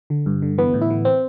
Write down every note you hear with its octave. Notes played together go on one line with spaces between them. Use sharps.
D3
G2
D3
E3 B3
A2
E4
E3
C4